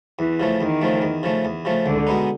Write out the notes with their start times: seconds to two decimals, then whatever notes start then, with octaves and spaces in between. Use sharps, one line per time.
0.19 E2 E3
0.40 C#3 F3 A3
0.61 E2 D#3
0.81 C#3 F3 A3
1.02 E2
1.23 C#3 F3 A3
1.45 E2
1.65 C#3 F3 A3
1.86 C#2 D3
2.07 B2 G#3 B3 D#4